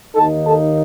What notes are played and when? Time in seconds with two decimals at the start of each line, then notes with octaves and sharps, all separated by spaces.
0.16 D#2 D#3 A#3 D#4 A4 A5
0.44 A4 A5